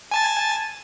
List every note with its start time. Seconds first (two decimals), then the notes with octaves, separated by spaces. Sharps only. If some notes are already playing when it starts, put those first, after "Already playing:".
0.11 G#5 A5 A6